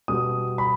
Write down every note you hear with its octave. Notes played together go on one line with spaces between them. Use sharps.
B2 G3 B3 D#6
B5